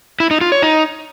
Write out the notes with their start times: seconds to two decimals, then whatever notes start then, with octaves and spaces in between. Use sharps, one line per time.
0.20 E4
0.31 D#4
0.41 F4
0.52 C#5
0.62 D#4